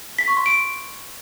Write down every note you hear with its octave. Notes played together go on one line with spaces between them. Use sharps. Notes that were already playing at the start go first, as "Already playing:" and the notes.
B6
C#6
C6
D7